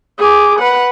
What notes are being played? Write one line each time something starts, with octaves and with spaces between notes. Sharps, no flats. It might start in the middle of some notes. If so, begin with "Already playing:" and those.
G#4 D6
B4 F#5